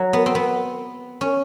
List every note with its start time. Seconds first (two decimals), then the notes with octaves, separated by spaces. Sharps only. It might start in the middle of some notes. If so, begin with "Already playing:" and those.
Already playing: F#3
0.13 B3
0.26 C4
0.35 B3
1.21 C#4